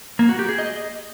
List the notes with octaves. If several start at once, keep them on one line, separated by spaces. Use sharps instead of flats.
A#3
F#4
G4
G#4
D#5